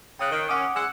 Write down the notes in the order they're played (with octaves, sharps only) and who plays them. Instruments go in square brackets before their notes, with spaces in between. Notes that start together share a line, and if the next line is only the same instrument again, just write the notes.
[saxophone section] C#3 [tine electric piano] G5 D#6 F#6
[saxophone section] D#3
[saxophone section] C#4 [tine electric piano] F#5 D6 D#6
[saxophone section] G#3 F#5 [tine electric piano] E6